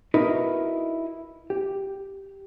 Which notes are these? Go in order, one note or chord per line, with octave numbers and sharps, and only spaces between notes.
D#4 E4 F#4 A#4 B4 D#5
G4